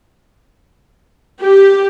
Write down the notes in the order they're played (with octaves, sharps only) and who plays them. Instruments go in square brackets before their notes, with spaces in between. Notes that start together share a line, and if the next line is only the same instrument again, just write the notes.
[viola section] G4